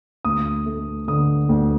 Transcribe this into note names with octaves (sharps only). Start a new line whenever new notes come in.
D2 D#6
A3
D3 D#6
D2